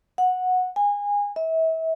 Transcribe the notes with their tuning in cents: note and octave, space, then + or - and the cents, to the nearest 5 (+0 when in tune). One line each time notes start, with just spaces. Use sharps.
F#5 -10
G#5 -25
E5 -35